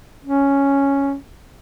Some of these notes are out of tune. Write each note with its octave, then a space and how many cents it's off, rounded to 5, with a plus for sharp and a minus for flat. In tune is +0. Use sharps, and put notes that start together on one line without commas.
C#4 +0